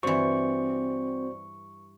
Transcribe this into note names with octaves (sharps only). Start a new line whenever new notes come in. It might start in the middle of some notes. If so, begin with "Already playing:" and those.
G2 E3 C4 F#4 C5 D5 C#6